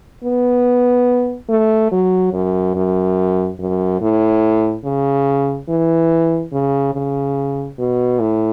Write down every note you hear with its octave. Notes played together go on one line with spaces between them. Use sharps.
B3
A3
F#3
F#2
F#2
F#2
A2
C#3
E3
C#3
C#3
B2
A2